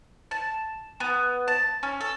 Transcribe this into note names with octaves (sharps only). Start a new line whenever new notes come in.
A5
B3
A5
C#4
A4